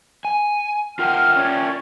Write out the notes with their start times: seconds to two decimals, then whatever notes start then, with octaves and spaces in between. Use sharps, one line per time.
0.25 G#5
0.99 F4 A#4 F#5 G5 F6
1.35 C#4 D5